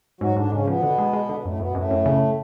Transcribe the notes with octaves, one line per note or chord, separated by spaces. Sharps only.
G#2 F#3 F#4
G#2 D3 D4
G#2 C#3 C#4
B2 F3 B3
D3
G#3
G#3
D3
F#2 A2 A3
F#2 B2 B3
F#2 A2 A3
F#2
C#3